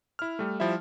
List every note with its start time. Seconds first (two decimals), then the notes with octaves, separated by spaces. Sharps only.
0.19 E4 F6
0.39 G3 A3
0.60 F3 G3 E4 E5